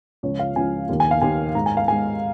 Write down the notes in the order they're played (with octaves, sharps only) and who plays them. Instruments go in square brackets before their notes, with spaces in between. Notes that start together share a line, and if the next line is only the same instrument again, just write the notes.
[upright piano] C#2 C#3 F3 C#5
F5
C#2 C#3 F3 G#5
D#2 D#3 A#3
G#5
F5
D#2 D#3 A#3 G#5
G#2 G#3 A#5
G#5
F5
G#2 G#3 G#5